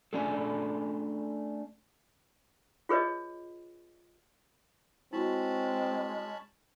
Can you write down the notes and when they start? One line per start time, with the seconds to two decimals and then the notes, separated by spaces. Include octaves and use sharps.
0.13 A3 C#4 D4 G#4 A4
2.89 F4 G#4 B4 C#5 D#5
5.13 G#3 C4 C#4 E4 F#4 A5 B5